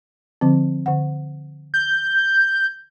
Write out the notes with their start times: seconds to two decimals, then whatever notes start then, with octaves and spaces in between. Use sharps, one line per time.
0.41 D3 F3 C4
0.86 D3 F#5
1.74 G6